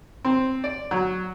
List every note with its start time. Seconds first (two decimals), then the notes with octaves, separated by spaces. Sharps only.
0.25 C4
0.64 D5
0.91 F#3